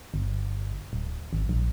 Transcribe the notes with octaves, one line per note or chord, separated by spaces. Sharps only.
G1
D1
G#1
A#1